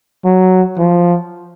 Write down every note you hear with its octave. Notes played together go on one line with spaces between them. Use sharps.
F#3
F3